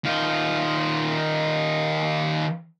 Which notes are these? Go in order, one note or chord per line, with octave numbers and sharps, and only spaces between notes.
D#3 F4